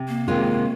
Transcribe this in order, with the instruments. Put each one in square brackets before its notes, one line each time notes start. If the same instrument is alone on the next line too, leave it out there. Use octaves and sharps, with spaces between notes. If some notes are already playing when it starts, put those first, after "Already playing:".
Already playing: [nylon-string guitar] C3
[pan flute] A#3
[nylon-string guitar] C3 D#3 G#3 F4